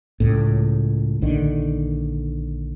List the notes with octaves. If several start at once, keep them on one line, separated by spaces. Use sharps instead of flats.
C#2 A2
A#1 D3 D#3